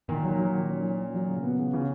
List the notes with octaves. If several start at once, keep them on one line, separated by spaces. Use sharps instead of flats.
A#2 D#3
F#3
F#3
D#3
C#4
F#3
C#4
F#3
C#3
B3
C#3
C#3